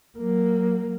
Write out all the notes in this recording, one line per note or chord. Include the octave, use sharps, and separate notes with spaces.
F#3 A#3